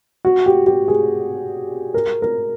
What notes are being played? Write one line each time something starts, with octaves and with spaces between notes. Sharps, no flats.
F#4
G4
G4
G#4
A#4
A#4